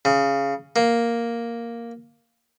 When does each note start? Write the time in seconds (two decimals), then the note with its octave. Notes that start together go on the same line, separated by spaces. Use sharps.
0.05 C#3
0.76 A#3